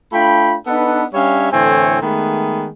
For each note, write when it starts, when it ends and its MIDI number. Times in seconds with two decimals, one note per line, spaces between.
0.12 0.56 57
0.12 0.56 62
0.12 0.56 65
0.12 0.56 79
0.12 0.56 83
0.67 1.04 59
0.67 1.04 62
0.67 1.04 63
0.67 1.04 69
0.67 1.04 71
1.14 1.48 55
1.14 1.48 61
1.14 1.48 62
1.14 1.48 73
1.14 1.48 76
1.14 1.48 77
1.52 1.97 45
1.52 1.97 50
1.52 1.97 52
1.52 1.97 60
1.52 1.97 73
1.52 1.97 80
2.02 2.67 51
2.02 2.67 56
2.02 2.67 57
2.02 2.67 59